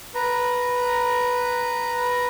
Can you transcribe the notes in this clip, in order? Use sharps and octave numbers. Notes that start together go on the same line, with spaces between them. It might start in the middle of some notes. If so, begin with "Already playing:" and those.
B4 A#5